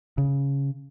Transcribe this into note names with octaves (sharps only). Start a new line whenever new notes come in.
C#3